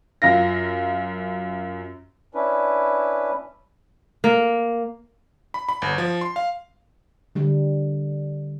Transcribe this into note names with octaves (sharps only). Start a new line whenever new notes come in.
F#2 F4 F5 A#6
C#4 D4 E4 B4
A#3
B5
B5
G1
F3
C6
F5
D3 G3